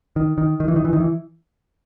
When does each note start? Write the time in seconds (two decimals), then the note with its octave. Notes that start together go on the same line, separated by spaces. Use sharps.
0.16 D#3
0.38 D#3
0.60 D#3
0.68 E3
0.76 D#3
0.85 E3
0.93 D#3
1.00 E3